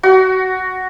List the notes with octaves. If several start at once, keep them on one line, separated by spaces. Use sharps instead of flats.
F#4